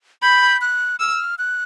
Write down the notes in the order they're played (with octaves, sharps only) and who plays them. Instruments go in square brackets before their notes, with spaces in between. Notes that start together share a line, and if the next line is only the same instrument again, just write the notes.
[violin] B5 [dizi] G6
[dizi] F#6
[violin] E6 [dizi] F6
[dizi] F#6